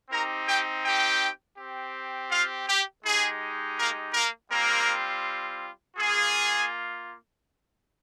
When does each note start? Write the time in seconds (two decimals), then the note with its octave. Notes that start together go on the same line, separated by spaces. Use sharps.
0.11 C4 D#4 G4 A#4 A#5
0.47 G4 G5
0.84 G4 G5
1.57 C4 G4
2.31 F4 F5
2.67 G4
3.04 G#3 D#4 G4 G#4
3.77 A#3 A#4
4.13 A#3 A#4
4.50 G3 A#3 C4 F4 A#4
5.97 A#3 F4 G#4